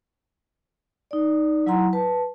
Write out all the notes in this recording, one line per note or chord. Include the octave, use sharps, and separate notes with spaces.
D#4 D5
F#3 E4 F#5 A#5 C6
B4 A5